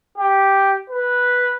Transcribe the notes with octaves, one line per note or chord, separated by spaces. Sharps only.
G4
B4